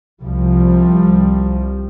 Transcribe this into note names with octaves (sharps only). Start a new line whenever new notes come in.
C2 F3 G3